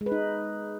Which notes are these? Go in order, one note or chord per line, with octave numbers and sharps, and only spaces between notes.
G#3
B4
D#4